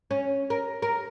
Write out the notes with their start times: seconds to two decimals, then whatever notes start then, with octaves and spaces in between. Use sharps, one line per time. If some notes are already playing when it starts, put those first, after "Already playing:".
0.11 C#4
0.50 A#4
0.82 A#4